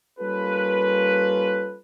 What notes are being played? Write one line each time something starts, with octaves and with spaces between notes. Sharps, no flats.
G3 A#3 C#4 F4 A4 B4